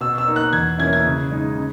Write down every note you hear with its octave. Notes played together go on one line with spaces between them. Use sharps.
B2 E6
E6
A#3 D#4
F#6
E2 G#6
B2 A#3 C#4 E4 G#6
G#6
C#3
G#3 D#4
C#3